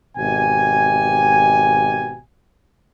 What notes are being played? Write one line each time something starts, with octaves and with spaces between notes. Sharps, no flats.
G#1 B2 G4 G#5